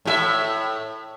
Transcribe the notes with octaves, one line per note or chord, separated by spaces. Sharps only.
A2 G4 E5